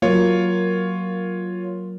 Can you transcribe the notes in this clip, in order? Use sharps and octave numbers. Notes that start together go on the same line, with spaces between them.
F#3 A#3 F4 C#5